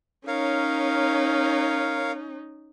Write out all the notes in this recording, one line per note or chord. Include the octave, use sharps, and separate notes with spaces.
C#4 D#4 A#4 C#5 F5